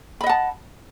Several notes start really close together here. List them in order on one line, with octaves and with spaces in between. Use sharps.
B5 D#5 F#5 A5